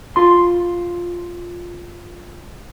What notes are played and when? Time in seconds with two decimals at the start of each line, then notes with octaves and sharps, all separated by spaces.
0.16 F4 C6